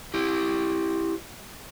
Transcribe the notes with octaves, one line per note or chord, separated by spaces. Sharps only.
E4 G4